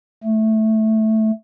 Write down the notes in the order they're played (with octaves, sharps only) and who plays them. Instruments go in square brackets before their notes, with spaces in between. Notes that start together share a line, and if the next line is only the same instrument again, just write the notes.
[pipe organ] A3